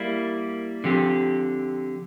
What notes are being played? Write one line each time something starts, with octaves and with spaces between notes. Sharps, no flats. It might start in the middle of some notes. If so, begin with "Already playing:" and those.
Already playing: G3 A#3 E4
D3 F3 C4 G4